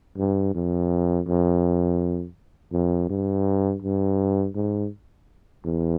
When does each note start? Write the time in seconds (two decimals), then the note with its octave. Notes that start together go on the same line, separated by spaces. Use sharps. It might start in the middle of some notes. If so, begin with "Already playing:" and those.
0.18 G2
0.55 F2
1.27 F2
2.73 F2
3.10 G2
3.82 G2
4.55 G#2
5.65 E2